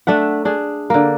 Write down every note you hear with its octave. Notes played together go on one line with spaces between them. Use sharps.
A3 D4 E5 F#5
D4 G#4
D3 A#3